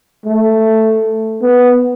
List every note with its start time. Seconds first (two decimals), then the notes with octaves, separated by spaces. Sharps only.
0.26 A3
1.42 B3